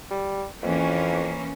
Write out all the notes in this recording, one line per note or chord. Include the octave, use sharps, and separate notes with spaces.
G3
F2 E3 A#3 C#4